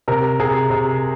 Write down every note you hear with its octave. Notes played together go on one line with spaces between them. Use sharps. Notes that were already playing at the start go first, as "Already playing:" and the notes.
C3 A#4
C3 G#4
C3